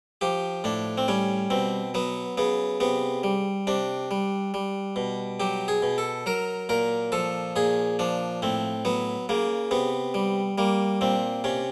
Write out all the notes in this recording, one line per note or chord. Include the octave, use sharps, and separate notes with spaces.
F3 G4
A2 D4
C4
G3 C#4
B2 C4
F#3 B3
C#3 B3
C3 B3
G3
C3 D4
G3
G3
B2
F#3 G4
G#4
B2
A4
F#3 A#4
A#2 A#4
F3 A4
A#2 G#4
F3 D4
A2 C4
F#3 B3
C#3 A#3
C3 B3
G3
G3 A#3
A#2 C4
C3 C#4